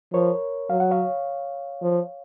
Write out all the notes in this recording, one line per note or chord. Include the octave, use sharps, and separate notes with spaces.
F3 A#4 C#5
F#3 F5
F#5
C#5 F5
F3